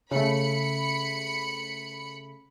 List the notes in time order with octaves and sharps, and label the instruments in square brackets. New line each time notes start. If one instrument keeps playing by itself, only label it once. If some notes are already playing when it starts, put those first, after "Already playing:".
[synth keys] C#3 A3 [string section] B5 C#7